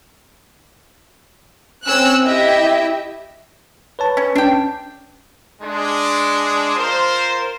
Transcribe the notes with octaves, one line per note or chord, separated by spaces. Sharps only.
C4 C#4 E6 F#6
E4 G4 D#5 E5
B4 C#5 A5
C#4
C#4 D4 G5
G#3 D4
F4 A#4 C5